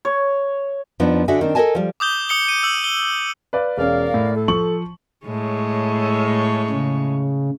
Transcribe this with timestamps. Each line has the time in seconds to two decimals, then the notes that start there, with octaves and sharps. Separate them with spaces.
0.05 C#5
1.00 F2 F3 B3 D4 D#4
1.28 D3 D4 F#4 D#5 E5 G#5
1.41 D#3 C4 D4
1.55 A4 A#4 C5 D#5 G#5 A5
1.75 F3 G3
2.00 D6 D#6 G6 G7
2.29 D#6 C#7 G7
2.48 D#7
2.63 E6 F#7
2.84 G7
3.53 B4 D5 F5
3.77 E1 C#4 A#4 D5 F5
4.14 A2
4.36 A4
4.48 F3 C#6 F#7
5.25 A2 G#3 C#5
6.70 C#3